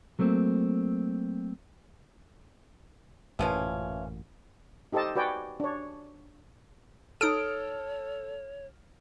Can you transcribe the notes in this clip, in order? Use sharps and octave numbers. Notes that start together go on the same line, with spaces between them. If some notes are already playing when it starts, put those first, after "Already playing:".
F#3 A3 A#3 C4
A1 F#2 A#2 E3 F3 C#4
D#4 G4 A4 C5 D#5 A5
F#4 B4 D5 G5 G#5
D4 C#5
D#4 A4 C#5 D#6 F6 D7